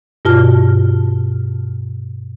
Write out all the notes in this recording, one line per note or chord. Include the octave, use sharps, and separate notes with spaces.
G2 B2 F4 F#4 A5 F6